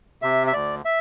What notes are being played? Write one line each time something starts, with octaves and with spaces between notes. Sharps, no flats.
C3 E5
E5
D2 D5
E5